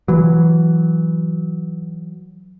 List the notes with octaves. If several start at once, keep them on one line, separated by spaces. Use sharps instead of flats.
E3 F#3